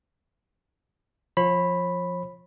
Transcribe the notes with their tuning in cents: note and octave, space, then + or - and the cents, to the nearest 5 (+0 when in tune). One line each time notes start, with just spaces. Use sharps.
F3 +0 C#5 -45 B5 +0